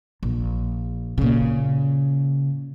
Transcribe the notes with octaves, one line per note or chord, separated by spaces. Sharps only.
A#1
A#2 C#3